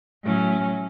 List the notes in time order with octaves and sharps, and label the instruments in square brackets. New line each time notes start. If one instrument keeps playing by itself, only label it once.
[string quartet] A2 F#3 A3 C#4